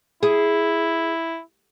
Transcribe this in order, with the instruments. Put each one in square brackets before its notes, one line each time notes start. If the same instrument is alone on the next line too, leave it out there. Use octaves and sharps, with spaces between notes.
[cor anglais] E4 [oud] G#4